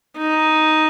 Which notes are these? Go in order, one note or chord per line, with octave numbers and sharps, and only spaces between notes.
D#4